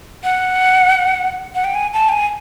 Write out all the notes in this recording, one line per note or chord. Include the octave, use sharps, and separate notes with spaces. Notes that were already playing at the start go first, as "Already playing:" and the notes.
F#5
F#5
G5
G#5
A5
G5
G#5